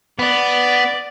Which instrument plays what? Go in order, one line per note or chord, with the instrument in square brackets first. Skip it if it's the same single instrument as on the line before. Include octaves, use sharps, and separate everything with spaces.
[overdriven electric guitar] B3 [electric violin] D5